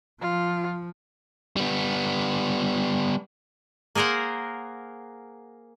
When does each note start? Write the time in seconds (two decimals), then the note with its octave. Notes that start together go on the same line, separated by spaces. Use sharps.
0.22 F3 F4
1.56 G3 B3
3.95 A#3 G#4 A#4 C5 F#5